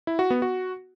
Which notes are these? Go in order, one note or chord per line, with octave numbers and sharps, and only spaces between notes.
E4
F#4
B3
F#4